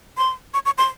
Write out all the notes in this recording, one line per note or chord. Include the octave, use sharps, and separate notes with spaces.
C6
C#6
C#6
C6